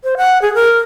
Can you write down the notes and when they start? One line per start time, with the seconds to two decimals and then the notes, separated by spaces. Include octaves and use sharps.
0.04 C5
0.17 F#5
0.42 G#4
0.55 A#4